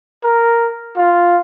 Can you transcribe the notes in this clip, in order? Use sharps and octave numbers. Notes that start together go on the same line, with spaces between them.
A#4
F4